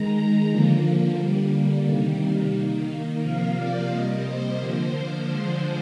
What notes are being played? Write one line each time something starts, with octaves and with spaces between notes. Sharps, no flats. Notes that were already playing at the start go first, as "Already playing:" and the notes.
Already playing: D#3 G#3 A#5
A#5
D3 F3 A#3
D3 G3 A#3
C3 D#3 G3 A#3
D#3 A#3
C3 F3 A#3 F5
D5
C3 G3 A#3 D#5
C5
D3 F3 A#3
D3 F3 G#3